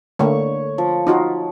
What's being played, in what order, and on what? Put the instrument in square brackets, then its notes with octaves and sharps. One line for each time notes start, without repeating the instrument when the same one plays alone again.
[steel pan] D3 A3 A#3 [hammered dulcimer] C#5 C#6
[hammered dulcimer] F3
[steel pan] D#4 F4 F#4